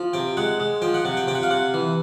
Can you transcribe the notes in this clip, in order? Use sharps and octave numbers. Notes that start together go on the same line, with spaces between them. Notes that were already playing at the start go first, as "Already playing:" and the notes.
Already playing: F3
C3 G5
G#3 F#5
G#3
F3 G5
F#5
C3 F#5
G5
C3 G5
F#5
F5
C3 F#5
E3